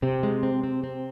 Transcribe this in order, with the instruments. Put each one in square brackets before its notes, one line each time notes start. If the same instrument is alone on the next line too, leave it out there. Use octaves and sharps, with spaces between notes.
[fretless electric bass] C3 [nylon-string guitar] C4
[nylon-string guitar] G#3
C4
C4
C4